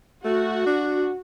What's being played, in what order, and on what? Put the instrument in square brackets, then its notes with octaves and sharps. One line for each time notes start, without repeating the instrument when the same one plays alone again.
[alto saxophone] A3 [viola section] F#4
[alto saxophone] D4